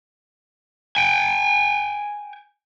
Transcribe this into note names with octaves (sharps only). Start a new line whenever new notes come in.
G5 G#5